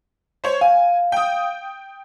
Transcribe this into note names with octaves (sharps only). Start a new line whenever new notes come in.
C5 C#5
F5 G#5
G5 D#6